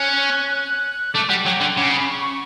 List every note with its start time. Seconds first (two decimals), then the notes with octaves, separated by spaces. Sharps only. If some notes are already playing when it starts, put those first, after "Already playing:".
Already playing: C#4 F#6
1.14 A3 D6
1.29 G3 F#5
1.45 F#3 G5
1.60 D3 F#5
1.77 C#3 D6
1.91 B5
2.07 C#6
2.22 C#6